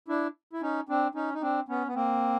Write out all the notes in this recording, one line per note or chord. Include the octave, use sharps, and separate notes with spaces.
D4 E4
E4
C#4 D#4
C4 D4
C#4 D#4
D#4
C4 D4
B3 C#4
B3
A#3 C4